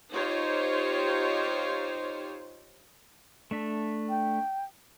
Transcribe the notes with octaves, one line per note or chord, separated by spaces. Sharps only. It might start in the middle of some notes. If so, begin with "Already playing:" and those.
D#4 F4 G4 C5 C#5
A3 D4 E5
G5